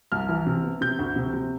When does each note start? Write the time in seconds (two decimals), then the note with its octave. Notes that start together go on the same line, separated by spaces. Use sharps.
0.12 C2 F6
0.29 E3
0.47 C3
0.64 B3
0.81 C3 G6
0.99 D2
1.16 C3
1.34 C3